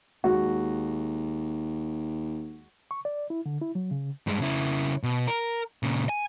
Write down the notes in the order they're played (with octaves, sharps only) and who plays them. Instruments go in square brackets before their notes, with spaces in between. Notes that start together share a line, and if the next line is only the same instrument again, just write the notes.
[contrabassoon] D#2 [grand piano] G#3 F#4
[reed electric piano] C#6
D5
E4
D3
E4
F#3
C#3
[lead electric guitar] G2 G#3
C#3 E4
B2
A#4
A#2 C#3
G#5